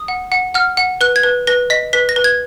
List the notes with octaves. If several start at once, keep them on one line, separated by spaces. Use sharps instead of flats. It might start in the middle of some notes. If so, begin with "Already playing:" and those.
Already playing: D#6
F#5
F#5
F#5 F6
F#5
B4 F#6
G#6
B4
B4 A#6
D#5 B6
B4 B6
A#6
B4
G#6